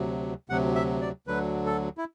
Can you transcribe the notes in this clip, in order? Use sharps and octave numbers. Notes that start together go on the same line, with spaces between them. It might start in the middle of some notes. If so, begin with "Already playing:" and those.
Already playing: D2 C3 F#3
D2 C3 F#3 F#5
E5
D5
D2 D3 F#3 B4
A4
E4